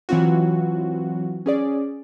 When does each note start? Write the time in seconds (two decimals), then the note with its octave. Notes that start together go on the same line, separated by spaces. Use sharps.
0.09 E3 F#3 C4 F4 F#4
1.46 C#4 G#4 D5